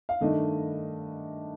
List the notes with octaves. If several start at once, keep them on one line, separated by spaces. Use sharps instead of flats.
F5
G2 D#3 A3 D4 D#5